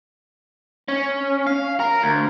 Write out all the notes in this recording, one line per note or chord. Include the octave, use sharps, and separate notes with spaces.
C#4
F5
A#4
D2